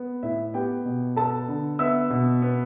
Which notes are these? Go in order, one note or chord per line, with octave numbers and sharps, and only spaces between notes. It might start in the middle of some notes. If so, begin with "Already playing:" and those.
Already playing: B3
A2 E4 E5
B3 G4 G5
B2
B3 A4 A5
D3
B3 E5 E6
B2
B3